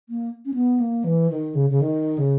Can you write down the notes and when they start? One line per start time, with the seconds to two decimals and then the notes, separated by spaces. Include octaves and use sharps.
0.09 A#3
0.45 C#4
0.54 B3
0.80 A#3
1.04 E3
1.30 D#3
1.55 C#3
1.70 C#3
1.81 D#3
2.18 C#3